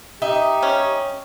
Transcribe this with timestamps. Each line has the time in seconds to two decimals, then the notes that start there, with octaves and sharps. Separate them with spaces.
0.22 D#4 G4 E5
0.63 C#4